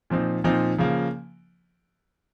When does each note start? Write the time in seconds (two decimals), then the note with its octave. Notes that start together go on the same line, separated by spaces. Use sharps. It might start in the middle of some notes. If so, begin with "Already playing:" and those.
0.10 A#2 F3 C4 D#4
0.44 A#2 F3 C4 D#4
0.78 C#3 F3 A#3